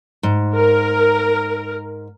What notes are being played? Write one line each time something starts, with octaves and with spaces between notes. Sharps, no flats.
G#2
A#4